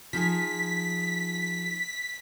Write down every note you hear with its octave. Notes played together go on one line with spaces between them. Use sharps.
F3 D#4 G#4 B6